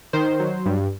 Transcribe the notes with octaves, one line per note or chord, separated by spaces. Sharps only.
D#3 C5
F#3
G2